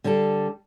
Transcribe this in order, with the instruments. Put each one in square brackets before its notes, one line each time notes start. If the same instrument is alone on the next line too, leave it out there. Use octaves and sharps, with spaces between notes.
[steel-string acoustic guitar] D3 G3 D4 A4